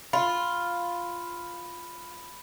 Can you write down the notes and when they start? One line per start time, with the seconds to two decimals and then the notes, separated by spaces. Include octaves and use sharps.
0.13 F4 B5